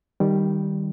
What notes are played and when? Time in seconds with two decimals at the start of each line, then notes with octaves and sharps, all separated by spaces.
0.20 D#3 G3